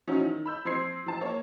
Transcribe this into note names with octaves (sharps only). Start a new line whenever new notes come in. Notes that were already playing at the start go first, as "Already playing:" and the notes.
F3 C#4 D#4 E4 F#4
D#3
B5 E6 G6
F3 C4 C6 G#6 C7
F3 A5
A#3 C#5